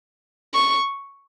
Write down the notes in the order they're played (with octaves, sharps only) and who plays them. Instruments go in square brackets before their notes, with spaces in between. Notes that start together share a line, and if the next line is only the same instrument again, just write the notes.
[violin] C#6